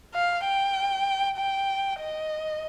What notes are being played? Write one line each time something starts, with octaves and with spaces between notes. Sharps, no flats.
F5
G5
G5
D#5